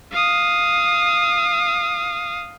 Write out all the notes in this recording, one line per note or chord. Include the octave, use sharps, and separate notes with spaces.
F5 D#6